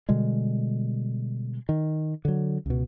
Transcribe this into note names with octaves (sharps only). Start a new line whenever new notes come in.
B2 D3 G3 G#3
D#3
D3 F#3
C#2 B2